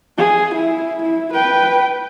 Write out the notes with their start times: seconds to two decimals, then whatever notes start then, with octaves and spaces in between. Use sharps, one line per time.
0.18 G#4
0.54 E4
1.02 E4
1.33 B4 G5